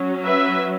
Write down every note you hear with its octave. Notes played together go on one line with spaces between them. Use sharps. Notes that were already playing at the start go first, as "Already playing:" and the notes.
Already playing: F#3 C#4
B4 E5